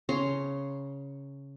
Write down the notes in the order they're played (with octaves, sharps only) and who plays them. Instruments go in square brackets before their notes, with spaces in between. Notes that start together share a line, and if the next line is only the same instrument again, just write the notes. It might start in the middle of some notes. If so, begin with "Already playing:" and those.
[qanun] C#3 C#5 A#5 C6